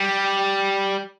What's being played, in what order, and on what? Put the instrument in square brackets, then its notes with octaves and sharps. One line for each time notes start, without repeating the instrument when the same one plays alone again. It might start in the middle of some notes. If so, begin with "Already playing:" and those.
Already playing: [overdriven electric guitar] G3